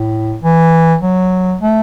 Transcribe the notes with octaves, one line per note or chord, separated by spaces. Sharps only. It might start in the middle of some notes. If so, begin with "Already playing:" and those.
Already playing: A2
E3
F#3
A3